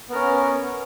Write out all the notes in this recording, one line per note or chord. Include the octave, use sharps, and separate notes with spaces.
B3 C#4 A#4